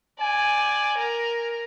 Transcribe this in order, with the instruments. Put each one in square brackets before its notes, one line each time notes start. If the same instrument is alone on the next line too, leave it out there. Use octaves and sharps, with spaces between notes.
[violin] D5 [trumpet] G#5
[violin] A#4